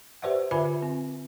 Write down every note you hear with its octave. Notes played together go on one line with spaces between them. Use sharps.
G4 B4 C5 D5 E5 F#5
D3 F4 B4 E5 G#5 B5
C4